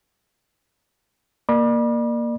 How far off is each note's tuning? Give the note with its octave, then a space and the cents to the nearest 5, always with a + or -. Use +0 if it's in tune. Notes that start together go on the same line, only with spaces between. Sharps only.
A#3 +5 D5 +35 B5 -35